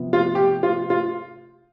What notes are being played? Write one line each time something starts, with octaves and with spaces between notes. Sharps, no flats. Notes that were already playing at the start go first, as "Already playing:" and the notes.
Already playing: C3 F3 B3
F4
G4
F4
F4